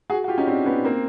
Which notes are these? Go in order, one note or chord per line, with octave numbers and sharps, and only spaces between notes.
F#4 G#4
F#4
F4 G4
C#4 D#4
C4 D4
B3 C#4
A#3 C4